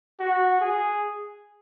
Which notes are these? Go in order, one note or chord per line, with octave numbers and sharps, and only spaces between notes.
F#4
G#4